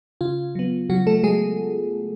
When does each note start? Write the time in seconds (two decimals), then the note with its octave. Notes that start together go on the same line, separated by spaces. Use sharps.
0.21 C#3 F4
0.55 F#3 B3
0.90 C#3 F#3 F#4
1.07 A3 A4
1.23 F#3 G#3 G#4